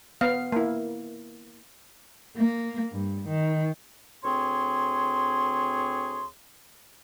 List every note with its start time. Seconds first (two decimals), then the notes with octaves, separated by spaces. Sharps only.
0.21 B3 F5
0.52 A#3 E4
2.37 A#3
2.93 G2
3.28 D#3
4.24 D2 C4 G#4 C#5 C6